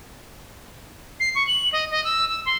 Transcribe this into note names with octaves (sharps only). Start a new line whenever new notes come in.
C7
C#6
F#7
D#5
D#5
E6
E6
C6